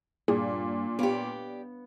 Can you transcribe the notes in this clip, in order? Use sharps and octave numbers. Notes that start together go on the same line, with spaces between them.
G2 A#2 G#4
B3 G4 C#5 D5 F5